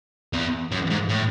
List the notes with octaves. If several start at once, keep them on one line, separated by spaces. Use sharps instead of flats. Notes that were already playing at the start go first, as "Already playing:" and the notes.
E2
F#2
G#2
A2